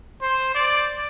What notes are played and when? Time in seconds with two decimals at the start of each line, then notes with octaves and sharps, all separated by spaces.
0.22 C5
0.55 D5